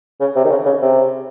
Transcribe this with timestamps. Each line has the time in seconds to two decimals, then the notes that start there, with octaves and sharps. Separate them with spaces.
0.20 C#3
0.36 C3
0.44 D#3
0.50 C#3
0.66 C#3
0.82 C3